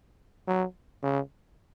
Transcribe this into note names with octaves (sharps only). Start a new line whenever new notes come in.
F#3
C#3